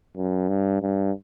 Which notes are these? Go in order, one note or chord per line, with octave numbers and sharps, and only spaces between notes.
F#2
G2
G2